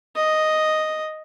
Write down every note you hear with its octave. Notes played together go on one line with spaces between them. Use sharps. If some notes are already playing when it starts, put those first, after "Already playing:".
D#5